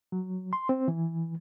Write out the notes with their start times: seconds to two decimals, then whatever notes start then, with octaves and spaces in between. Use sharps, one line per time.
0.12 F#3
0.53 C6
0.69 C4
0.88 E3